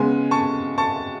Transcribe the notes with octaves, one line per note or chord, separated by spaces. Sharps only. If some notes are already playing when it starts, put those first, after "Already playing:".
Already playing: C#3 G#3 B3 G#5
A5 C#6
A5 C#6